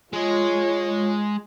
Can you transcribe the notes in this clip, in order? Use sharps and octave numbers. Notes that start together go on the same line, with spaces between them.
G#3 F4 C#5 D#5